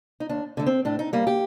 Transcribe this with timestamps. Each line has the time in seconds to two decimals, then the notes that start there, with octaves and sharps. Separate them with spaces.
0.20 D#4
0.29 D#2 D4
0.57 D3 A3
0.66 C4
0.85 A2 D4
0.99 D#4
1.13 G3 A#3
1.27 G4